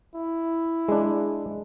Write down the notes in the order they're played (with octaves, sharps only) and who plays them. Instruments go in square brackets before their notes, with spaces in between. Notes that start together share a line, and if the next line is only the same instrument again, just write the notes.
[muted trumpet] E4
[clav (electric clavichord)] G#3 D4